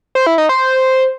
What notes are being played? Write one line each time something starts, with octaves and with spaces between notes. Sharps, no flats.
C5
E4
D#4
C5